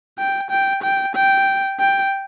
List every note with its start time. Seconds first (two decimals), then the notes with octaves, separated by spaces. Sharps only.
0.18 G5
0.51 G5
0.83 G5
1.15 G5
1.80 G5